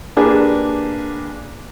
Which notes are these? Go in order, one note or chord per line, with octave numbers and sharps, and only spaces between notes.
A#3 D4 G4 G#4 B4